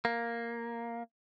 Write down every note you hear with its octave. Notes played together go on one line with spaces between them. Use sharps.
A#3